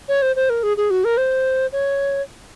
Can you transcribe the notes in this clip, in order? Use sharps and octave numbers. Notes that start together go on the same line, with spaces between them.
C#5
C5
C5
A#4
G#4
G#4
F#4
A#4
C5
C#5